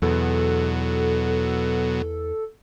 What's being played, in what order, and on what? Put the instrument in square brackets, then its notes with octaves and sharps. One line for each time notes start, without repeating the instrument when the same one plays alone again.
[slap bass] E2 [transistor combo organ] B2 F#3 [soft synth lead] A4